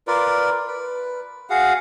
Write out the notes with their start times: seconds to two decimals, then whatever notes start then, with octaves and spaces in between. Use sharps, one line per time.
0.07 F4 A#4 B4 D5
0.67 B4
1.50 F#4 G#4 F5 F#5